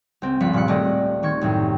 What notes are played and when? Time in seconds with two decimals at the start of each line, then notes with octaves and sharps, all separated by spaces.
0.22 C#2 C4
0.40 G1 C#2 F3 B5 B6 C#7
0.53 G2 A#2 D5 F#6 C#7
0.68 D#1 A3 G#4 D5 D#5
1.23 D#3 C4 C#6 G#6 C#7
1.41 C2 F#2 A2